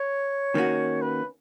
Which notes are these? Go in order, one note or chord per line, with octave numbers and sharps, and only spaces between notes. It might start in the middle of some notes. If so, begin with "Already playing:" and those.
Already playing: C#5
D#3 A#3 C#4 F#4
B4